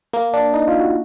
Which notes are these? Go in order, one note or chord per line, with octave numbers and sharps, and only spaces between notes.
A#3
D4
D#4
F4
F#4